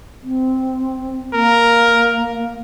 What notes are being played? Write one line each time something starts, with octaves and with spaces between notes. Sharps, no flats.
C4
A#3 A#4